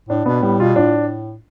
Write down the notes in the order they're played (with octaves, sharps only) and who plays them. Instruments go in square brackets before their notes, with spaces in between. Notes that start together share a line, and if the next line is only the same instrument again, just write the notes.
[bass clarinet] A2 [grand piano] D4
[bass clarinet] B2 [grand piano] B3
[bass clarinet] A2 [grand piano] G3
[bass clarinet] B2 [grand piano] F4
[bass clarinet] A2 [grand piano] D4